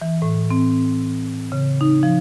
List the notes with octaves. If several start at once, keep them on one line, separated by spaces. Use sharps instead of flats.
E3
A2
C4
C#3
D#4
F3